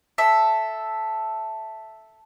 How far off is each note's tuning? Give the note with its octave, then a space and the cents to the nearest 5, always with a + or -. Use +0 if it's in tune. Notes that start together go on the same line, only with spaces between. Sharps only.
A4 +0 E5 +0